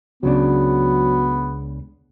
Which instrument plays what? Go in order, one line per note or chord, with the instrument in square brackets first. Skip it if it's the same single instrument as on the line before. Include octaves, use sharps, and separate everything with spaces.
[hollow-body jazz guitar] C#2 C#3 D4 [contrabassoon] F#3 [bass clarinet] B3